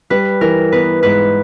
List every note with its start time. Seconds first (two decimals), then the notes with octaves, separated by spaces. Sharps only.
0.10 G3 B4
0.41 E3 A#4
0.72 B3 B4
1.03 G#2 B4